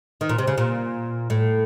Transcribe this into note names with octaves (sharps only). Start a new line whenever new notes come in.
D#3
A#2
C3
C#3
A#2
A2